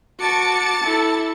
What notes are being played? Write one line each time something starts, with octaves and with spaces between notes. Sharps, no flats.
F#4 A5 D6 A6 C#7
E4 A4